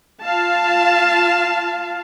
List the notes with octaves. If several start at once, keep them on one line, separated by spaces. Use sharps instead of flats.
F4 F5 A5